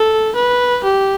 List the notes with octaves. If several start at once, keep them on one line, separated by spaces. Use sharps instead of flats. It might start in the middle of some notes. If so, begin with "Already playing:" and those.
Already playing: A4
B4
G4